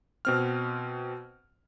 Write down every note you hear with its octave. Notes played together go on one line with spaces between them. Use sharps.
B2 C4 F6